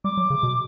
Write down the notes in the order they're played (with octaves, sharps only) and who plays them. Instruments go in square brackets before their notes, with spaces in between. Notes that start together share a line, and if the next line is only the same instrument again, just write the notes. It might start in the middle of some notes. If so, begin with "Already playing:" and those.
[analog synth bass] G3 [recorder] D6
[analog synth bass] F#3
C#3
B2